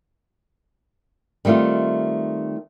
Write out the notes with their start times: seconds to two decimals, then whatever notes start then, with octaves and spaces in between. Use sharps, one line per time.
1.45 D#3 G3 A3 C4 F4